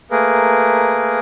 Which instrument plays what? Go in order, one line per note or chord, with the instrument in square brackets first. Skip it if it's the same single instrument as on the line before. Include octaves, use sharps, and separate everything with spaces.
[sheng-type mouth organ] A3 A#3 G#4 A#4 B4